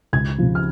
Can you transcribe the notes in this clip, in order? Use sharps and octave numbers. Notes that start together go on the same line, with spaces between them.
C#2 G#6
C#3 F3
F6